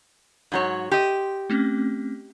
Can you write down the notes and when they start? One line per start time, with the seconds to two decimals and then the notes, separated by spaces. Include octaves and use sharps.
0.52 G#2 F#3 C#5
0.92 G4 D#5 C6
1.50 A3 C4 C#4